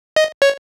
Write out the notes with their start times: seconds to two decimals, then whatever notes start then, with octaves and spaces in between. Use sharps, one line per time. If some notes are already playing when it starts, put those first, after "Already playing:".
0.16 D#5
0.42 C#5